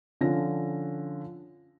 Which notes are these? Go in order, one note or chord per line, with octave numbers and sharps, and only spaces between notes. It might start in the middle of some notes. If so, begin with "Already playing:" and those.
D3 F3 C#4 F5 A#6